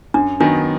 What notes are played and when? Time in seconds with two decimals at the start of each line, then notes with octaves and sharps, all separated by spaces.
0.14 F#2 D4
0.40 D#3 F#3 B3 D4 D#4